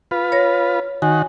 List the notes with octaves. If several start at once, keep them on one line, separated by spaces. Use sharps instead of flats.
F4 B4
C#5 A#6
D#3 F#4 G#5